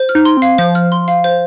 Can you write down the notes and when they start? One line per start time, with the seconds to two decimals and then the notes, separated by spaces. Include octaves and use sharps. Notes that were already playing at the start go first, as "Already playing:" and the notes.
Already playing: C5
0.09 F6
0.15 D#4
0.25 C6
0.37 C4
0.42 F5
0.58 F3 C5
0.75 F6
0.92 C6
1.08 F5
1.24 C5